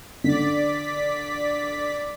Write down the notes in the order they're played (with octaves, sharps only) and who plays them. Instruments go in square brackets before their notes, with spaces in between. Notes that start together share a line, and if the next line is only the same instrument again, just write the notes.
[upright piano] D3 [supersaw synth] D5 B6